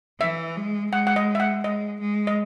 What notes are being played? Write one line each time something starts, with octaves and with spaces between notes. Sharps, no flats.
E3 E5
G#3
G#3 F#5
F#5
D#5
E5
F#5
G#3 D#5
G#3
D#5